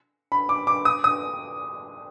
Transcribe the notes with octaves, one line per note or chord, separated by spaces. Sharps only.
B5
D6
D6
D#6
D#6